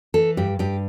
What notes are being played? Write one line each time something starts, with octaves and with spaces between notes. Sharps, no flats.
E3 A4
G2 G4
G2 G4